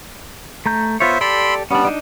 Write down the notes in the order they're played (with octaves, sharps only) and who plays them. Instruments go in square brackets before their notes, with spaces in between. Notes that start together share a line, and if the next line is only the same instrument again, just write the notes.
[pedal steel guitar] A3 A#5 G6
[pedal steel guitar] B3 F4 C#5 [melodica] C5 E5
[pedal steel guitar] G4 A4 D5 [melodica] B5 C6 E6
[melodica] G3 B3 [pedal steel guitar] C#4 D4
[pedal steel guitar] D4 D#4